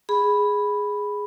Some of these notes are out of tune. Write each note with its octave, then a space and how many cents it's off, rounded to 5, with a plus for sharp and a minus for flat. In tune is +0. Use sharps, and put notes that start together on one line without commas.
G#4 +0 B5 +0